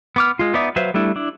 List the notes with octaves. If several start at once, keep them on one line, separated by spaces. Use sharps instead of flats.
B3 D6 F6
G#3 F4
B3 D#4 D5 E5
F#3 B4 C5 E5 F5
G3 A3 D4 E4
D4 E4